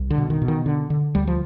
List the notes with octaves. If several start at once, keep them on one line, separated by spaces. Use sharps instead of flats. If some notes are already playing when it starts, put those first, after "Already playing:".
Already playing: C2
D3
B2
D#3
B2
D#3
D3
D3
D2 G3
F3